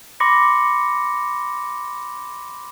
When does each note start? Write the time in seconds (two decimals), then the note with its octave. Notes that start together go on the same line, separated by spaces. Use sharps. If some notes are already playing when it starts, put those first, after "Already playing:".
0.20 B5 C6 D6 A#6 C#7